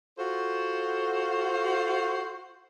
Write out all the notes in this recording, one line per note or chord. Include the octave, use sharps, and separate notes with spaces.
F4 F#4 A4 C5